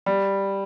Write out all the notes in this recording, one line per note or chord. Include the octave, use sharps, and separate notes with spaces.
G3